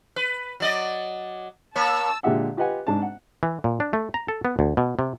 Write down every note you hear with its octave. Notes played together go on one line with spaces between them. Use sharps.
B4
F#3 D5 D#5
A#3 C#5 A5 E6
A#2 D3 G#3 G4 E5 F#5
F4 G4 B4 D#5 F#5 G#5
G#2 D4 A5
F#5
E3
A#2
D4
A3
A#5
A4
B3
D2
B2
C3